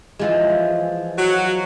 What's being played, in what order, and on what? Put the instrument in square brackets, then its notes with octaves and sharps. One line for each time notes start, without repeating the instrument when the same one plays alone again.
[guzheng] E3 F3 G#3
[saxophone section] F#3 F#4